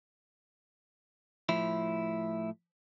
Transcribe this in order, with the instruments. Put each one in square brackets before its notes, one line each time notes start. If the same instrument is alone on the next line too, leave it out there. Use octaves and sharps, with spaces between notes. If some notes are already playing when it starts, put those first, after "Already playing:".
[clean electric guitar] A2 F3 E4